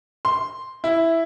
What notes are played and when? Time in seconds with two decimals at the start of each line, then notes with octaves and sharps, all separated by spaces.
0.25 C6
0.84 E4